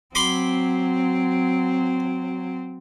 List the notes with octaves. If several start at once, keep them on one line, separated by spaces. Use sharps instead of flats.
F#3 C4 B5 C6 D6